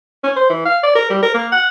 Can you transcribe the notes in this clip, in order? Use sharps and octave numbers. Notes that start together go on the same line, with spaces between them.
C#4
C5
E3
F5
D5
A#4
G3
A#4
A#3
F#5